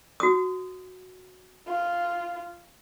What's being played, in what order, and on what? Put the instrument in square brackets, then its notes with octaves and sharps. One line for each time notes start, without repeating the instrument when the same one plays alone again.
[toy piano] F#4 D#6
[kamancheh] F4